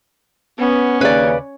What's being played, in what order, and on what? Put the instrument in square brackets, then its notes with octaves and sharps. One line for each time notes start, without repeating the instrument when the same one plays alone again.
[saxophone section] B3 [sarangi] C#4
[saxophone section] D#2 C#3 [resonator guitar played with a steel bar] B4 D5